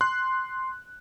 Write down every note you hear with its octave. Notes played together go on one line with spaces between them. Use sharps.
C6 F#6